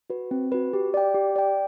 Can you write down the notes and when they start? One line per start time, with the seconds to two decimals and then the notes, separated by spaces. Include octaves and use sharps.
0.10 F#4 B4
0.31 C4
0.52 F#4 B4
0.73 G4
0.94 D5 G5
1.15 G4
1.36 D5 G5